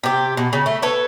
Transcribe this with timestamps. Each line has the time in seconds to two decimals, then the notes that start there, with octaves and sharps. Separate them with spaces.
0.04 C3 G4
0.37 B2
0.53 C#3
0.66 A3
0.82 A4 B4 C#5